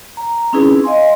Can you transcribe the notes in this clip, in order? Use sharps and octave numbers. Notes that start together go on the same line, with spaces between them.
A#5
C4 C#4 D#4 E4 G#4 B4
D#5 F5 G#5 C6